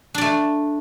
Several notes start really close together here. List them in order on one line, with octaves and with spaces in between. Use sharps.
D4 D5 A3